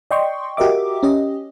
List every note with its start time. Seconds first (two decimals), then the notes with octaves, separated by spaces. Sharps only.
0.11 D5 D#5 G5 C6 C#6
0.57 F#4 G4 A#4 D#5 E5 D6
1.03 C#4 G4 D#5